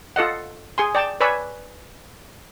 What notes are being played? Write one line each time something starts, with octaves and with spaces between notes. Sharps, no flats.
F4 A4 D#5 F#5
G#4 G#5 C6
D5 G5 A5
B4 C#5 D5 G#5 B5 E6